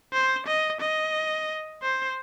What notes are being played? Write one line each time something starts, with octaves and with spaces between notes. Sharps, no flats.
C5
D#5
D#5
C5